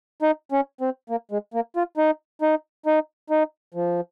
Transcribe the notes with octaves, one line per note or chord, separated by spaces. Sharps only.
D#4
C#4
C4
A#3
G#3
A#3
F4
D#4
D#4
D#4
D#4
F3